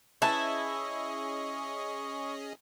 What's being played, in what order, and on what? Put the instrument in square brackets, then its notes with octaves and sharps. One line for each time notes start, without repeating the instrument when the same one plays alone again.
[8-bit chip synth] C#4 G#4 D#5 [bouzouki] E4 [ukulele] B4 A5 [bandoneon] C#6